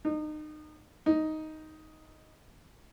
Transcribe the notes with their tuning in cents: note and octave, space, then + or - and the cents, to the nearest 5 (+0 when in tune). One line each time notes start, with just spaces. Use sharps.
D#4 -30
D#4 +5